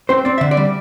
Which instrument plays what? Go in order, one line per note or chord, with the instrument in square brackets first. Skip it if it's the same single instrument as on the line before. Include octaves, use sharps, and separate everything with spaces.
[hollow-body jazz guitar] C4 C5
C4 D5
D3 E5
D5
G3